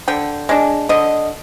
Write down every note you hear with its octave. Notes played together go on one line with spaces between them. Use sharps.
D3 G5
G#3 D4
D3 D#5